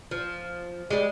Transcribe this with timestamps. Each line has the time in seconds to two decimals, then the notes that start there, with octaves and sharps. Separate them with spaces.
0.11 F3
0.90 G3 G#3